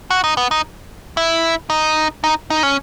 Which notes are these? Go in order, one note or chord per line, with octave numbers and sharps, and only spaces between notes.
F#4
D#4
B3
D#4
E4
D#4
D#4
D#4
C#4